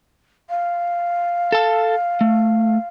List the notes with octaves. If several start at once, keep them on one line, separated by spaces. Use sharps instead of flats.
F5
A4 A5
A3